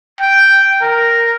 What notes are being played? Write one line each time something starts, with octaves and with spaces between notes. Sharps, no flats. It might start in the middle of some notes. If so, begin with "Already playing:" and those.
G5
A#4